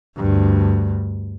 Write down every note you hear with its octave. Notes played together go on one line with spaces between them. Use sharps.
D2 G2